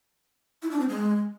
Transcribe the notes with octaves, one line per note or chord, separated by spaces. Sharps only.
E4
D4
C4
G#3